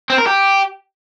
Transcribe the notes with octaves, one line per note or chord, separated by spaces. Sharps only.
C4
A#4
G4